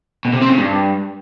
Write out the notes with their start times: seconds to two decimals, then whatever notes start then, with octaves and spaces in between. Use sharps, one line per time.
0.25 B2
0.33 C3
0.41 C4
0.50 C#3
0.58 G2